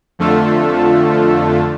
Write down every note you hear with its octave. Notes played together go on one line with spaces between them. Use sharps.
F2 D3 A3 F4 A4